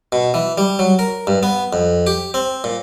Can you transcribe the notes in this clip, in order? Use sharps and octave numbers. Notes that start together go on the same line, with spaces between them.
B2
E3
G3
F#3
A#4
G2
B3
F2
G4
C4
A#2